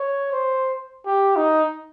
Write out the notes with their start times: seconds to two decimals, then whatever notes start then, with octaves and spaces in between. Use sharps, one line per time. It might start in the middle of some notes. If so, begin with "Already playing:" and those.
Already playing: C#5
0.33 C5
1.06 G4
1.36 D#4